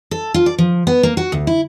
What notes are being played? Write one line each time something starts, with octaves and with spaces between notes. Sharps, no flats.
A4
F4
D5
F3
B3
A#3
F#4
D2
E4